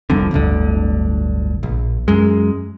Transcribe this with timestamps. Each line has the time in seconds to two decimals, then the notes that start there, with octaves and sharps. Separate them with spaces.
0.10 F1 C2 F2 D3
0.31 D1 G1 D2 D3
1.63 A#1
2.08 F#2 G#3